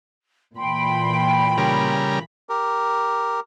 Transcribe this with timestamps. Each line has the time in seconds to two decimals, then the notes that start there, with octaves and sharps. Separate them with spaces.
0.56 A#2 E3 G5 B5 C6
1.58 C#3 G3 A#4
2.49 G4 A#4